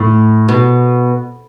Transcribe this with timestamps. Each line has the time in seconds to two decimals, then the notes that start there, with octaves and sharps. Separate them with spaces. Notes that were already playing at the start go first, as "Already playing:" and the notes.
Already playing: A2
0.49 B2